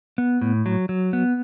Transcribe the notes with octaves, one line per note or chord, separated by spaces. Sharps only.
B3
A2
F#3
F#3
B3